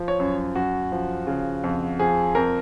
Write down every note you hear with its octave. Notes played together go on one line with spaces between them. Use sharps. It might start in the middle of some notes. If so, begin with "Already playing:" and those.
Already playing: F3
C#5
F#2
F#2 F#4
F3
C#3
F2
F3 G#4
F2 A#4